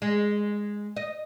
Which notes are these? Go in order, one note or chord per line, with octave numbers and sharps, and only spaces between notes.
G#3
D#5